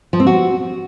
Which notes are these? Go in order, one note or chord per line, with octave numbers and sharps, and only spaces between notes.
F3
C4
F#4